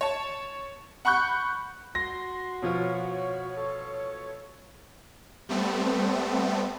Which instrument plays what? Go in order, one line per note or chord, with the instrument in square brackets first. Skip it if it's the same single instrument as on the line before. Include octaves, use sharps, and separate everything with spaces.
[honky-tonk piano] C#5 A5
F#5 B5 C#6 F#6 G6
[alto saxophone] F#4 [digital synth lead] C6 [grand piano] A#6
[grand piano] B2 F3 F4 [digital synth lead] C#5
[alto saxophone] A4
[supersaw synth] G3 A3 B3 C4